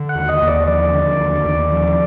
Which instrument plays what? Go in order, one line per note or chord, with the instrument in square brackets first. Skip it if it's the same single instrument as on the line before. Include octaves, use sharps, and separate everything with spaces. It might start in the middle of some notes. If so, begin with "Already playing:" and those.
Already playing: [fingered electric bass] D3
[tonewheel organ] F#5
[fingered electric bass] D#2
[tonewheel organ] D#5
[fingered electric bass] D#2
[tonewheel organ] D5
[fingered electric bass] F3 [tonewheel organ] D5
[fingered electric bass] D3
D#2
D#2
F3